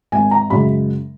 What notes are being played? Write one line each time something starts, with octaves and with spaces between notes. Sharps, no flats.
G#1 G#5
A#5
F#2 C#3 G#3 B5